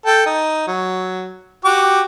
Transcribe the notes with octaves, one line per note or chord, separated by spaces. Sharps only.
A4 G5
D#4
F#3
F#4 G4 D6